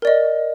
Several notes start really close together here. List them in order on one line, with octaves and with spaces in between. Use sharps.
A#4 D5 D#5